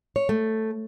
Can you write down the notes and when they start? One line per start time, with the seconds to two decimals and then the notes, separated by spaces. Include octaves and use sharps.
0.16 C#5
0.29 A3